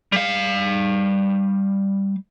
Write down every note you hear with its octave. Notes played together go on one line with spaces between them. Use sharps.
G3 F5